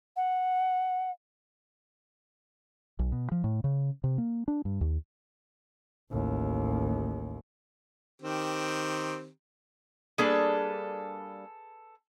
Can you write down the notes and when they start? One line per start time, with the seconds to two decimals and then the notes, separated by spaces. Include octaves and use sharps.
0.16 F#5
2.99 B1
3.12 B2
3.32 F3
3.44 A2
3.64 C#3
4.04 C3
4.18 A#3
4.48 D4
4.65 G2
4.81 D#2
6.11 A1 D#2
8.22 D#3 C4 G4
10.18 G3 A#3 D4 G#4 A4 B4